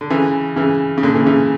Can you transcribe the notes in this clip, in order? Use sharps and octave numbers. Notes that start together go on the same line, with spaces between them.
D3
C#3 E3
C#3 E3
C#3
A#2 D3
C#3 E3
C#3 E3